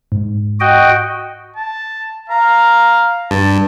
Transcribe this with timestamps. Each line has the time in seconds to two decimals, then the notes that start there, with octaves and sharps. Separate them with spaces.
0.12 G#2
0.60 F#4 D#5 G5
1.56 A5
2.30 F5 A#5
3.31 G2 A5